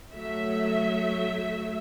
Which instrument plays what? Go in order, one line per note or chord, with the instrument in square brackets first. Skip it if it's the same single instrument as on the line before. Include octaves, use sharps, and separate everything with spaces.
[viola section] F#3 A3 E5